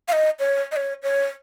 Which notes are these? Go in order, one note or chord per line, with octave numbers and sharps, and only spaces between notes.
F5
D#5
C#5
D#5
C#5
C#5